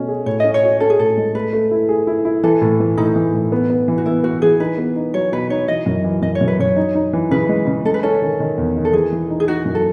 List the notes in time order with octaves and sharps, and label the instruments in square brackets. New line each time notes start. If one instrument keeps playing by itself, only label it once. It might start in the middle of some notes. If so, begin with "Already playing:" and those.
Already playing: [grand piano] B2 A3 C#4
G#4
[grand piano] A2 [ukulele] C#5
[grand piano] C#4 [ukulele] D#5
[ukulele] C#5
[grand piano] F#4
[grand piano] C#4 [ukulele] A4
[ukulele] G#4
[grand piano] A2 [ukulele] A4
[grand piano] G#3
[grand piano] A3 [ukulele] B4
[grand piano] A3
E4
G#4
E4
E4
[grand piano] E3 [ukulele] A4
[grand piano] A2
E3
[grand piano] A2 [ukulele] D#4
[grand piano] E3
A2
B3
B3
E3
[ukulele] F#4
[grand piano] B3 [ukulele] E4
[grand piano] B3 [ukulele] F#4
[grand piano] E3 [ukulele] G#4
[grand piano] D#4 [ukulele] B4
[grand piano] B3
D#4
[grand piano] F#3 [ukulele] C#5
[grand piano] B2 [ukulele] B4
[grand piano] D#4 [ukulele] C#5
[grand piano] E3 [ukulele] D#5
[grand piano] F#2
E3
[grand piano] F#2 [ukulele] D#5
[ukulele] C#5
[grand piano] F#2
[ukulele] B4
[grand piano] F#2 [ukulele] C#5
[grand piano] D#4
D#4
E3
[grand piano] C#3 [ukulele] B4
[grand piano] G#3
C#3
[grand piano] G#3 [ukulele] A4
[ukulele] B4
[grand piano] C#4 [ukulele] A4
[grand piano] D#3
D#3
E2
D#3
[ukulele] A4
[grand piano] E3 [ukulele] G#4
[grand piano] E3
D#4
[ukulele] G#4
[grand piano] D#4 [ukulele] F#4
[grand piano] F#2
[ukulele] A4